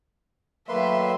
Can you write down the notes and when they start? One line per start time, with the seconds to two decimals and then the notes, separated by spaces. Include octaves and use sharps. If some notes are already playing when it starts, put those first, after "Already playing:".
0.69 D#3 F#3 A3 A#3 B4 E5 C6